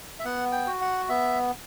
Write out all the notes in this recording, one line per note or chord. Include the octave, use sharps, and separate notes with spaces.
E5
B3 F#5
G5
F#4
F#5
B3 E5